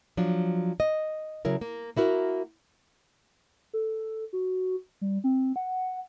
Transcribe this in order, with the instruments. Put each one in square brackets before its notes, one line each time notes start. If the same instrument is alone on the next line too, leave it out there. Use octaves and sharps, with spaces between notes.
[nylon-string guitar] F3 F#3 D4
D#5
C#3 F#3 E4 A#4
A#3
A#3 E4 F#4 A#4
[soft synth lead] A4
F#4
G3
C4
F#5